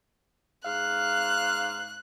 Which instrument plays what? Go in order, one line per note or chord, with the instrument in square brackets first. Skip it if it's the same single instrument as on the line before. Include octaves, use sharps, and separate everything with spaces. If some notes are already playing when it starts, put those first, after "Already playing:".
[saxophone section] G#2 F5 [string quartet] F#6